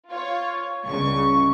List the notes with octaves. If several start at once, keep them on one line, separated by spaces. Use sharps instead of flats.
F4 C#5
C#2 G2 C#3 C#6